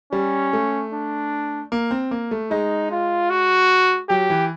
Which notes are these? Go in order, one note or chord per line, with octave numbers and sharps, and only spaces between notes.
G3 C#4
A3
D4
A#3
C4
A#3
A3
G#3 D#4
F4
F#4
F#3 G4
E3